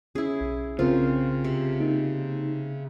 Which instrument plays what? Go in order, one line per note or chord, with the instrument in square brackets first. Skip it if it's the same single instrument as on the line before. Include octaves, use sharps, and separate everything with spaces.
[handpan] C#4 [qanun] E4 G#4
[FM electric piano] B1
[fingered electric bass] C#3 [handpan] C4 A#4 C5 [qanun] F4
[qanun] C3
[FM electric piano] A#3 D#4